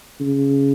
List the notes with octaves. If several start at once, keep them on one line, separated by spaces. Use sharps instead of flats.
C#3